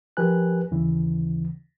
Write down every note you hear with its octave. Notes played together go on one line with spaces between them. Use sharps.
F3 G4 A#4 B4 G#5 F#6
D#2 C#3 E3